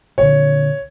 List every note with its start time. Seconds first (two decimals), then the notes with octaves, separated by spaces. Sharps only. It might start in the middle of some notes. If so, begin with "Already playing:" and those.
0.18 A#2 D3 C#5